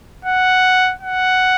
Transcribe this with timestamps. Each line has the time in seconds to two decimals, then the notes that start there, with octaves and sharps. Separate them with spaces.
0.25 F#5
1.02 F#5